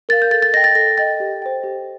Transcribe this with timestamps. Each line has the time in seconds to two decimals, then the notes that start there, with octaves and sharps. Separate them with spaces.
0.09 A#4 F5 A6
0.22 G6
0.31 A4 A6
0.42 A6
0.53 D#5 A#6
0.57 G5
0.64 A6
0.75 A4 A#6
0.98 D#5 G5 A6
1.20 G4
1.42 C5 G5
1.64 G4